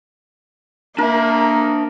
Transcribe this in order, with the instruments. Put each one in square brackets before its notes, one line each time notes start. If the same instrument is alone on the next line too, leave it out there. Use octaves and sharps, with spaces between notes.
[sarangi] A#3 [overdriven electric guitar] D4 E5 [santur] A#4